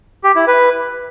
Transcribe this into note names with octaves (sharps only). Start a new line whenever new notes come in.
G4
E4
B4